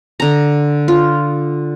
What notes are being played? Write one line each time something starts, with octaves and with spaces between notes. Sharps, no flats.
D3 A#5
F4